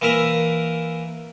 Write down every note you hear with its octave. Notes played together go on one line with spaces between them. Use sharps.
E3 A#3 A#4 E5 A#5